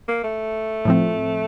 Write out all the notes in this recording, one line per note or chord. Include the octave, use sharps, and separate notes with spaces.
A#3
A3
A2 F3 C4